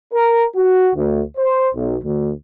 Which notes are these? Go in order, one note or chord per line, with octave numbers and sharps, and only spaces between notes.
A#4
F#4
D2
C5
B1
D2